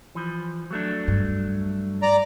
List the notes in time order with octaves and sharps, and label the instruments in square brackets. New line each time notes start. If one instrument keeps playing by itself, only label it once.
[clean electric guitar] E3 F3
F#3 A3 D4
[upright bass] G2
[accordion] D5 A#5